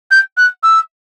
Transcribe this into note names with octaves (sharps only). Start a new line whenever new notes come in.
G6
F#6
E6